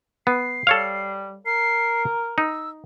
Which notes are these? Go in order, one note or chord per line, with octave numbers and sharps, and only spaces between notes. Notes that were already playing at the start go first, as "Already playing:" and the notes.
B3 C7
G3 A4 C#5 F5
A#4 C7
D#4 E6